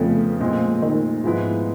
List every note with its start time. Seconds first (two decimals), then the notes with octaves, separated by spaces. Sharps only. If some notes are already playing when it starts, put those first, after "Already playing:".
Already playing: F2 C#3 F3 A3 B3
0.40 A#2 F3 G#3 C4
0.82 D#3
1.24 G#2 F3 G#3 B3 E4